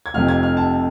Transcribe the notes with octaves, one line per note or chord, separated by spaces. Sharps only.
G#6
F1 F2 C3 F3 F6
G#6
F6
A5